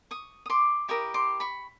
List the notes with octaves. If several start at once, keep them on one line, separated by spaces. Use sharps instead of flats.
C#6 D#6
D#6
C6 D6
E4 G4 A#4 C#6 D#6
C6 D6
B5 C#6